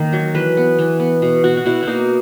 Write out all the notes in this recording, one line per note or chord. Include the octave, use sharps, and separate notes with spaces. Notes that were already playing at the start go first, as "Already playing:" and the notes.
Already playing: D#3 A#3
F#3
E3 B4
B3
E3
B3
B2
B2 F#4
F#4
B2 E4
A#3 D#4 E4